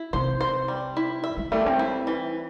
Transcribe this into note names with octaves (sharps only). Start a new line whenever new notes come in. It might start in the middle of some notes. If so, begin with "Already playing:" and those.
Already playing: E4
C3 C5
C5
G3
E4
E5
G3
G3 A3
C4
E4
E3